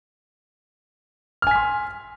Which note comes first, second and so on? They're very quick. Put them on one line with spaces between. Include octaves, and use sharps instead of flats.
F6 G#5 B6 C6